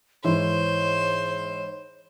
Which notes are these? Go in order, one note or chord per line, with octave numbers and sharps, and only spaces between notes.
G#2 E3 C5 C#5